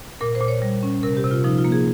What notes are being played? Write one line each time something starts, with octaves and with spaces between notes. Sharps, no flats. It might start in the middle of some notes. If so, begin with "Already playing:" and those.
A#2 A#4
C5
A#2
C#5
G3
C#4
C3 A#4
G4
C3
F4
F3 D#4
F4
A#3
G#4